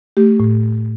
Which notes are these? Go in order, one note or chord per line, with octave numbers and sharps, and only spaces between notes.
A3 G4
A2